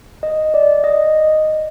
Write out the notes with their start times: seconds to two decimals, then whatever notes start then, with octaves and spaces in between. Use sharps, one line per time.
0.23 D#5
0.54 D5
0.84 D#5